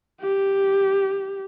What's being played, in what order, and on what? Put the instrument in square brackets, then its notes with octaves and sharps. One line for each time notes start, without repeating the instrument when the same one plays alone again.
[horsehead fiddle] G4